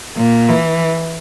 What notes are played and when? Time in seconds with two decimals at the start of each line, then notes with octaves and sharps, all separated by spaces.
0.17 A#2
0.49 E3